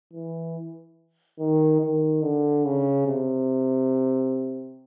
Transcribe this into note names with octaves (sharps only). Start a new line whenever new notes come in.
E3
D#3
D#3
D3
C#3
C3